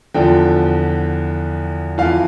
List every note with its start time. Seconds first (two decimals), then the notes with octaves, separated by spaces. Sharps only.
0.14 E2 D3 F3 G5
1.98 F2 E3 F5